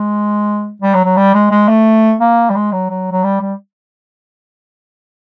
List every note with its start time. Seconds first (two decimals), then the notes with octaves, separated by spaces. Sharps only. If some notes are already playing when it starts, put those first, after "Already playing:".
Already playing: G#3
0.82 G3
0.94 F#3
1.05 F#3
1.17 G3
1.34 G#3
1.51 G#3
1.68 A3
2.20 A#3
2.50 G3
2.55 G#3
2.72 F#3
2.90 F#3
3.12 F#3
3.24 G3
3.41 G3